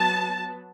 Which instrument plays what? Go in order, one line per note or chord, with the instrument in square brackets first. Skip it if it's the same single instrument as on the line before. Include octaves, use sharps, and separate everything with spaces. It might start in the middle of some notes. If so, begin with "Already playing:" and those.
Already playing: [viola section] F#3 B3 A5